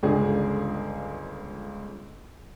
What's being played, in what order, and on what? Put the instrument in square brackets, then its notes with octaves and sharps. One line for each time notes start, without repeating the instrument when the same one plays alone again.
[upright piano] G1 C#2 G#4 D5